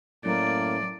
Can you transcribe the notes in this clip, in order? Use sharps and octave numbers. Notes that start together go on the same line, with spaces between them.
F#2 A2 A#3 D5